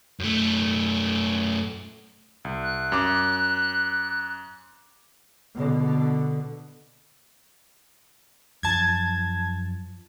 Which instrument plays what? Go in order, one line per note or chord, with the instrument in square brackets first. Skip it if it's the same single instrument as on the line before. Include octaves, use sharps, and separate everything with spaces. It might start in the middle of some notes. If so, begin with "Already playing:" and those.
[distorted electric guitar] F#2 A3
[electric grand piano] C2
[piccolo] F#6
[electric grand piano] F#2 D6
[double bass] B2 D3
[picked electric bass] F#2 F3 [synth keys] A5 G#6